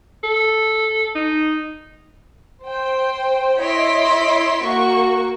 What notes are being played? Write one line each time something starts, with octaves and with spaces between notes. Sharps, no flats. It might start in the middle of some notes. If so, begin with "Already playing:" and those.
A4
D#4
C5 G5
E4 C#5 D#5 C6 B6 D7
A#3 F#4 C#6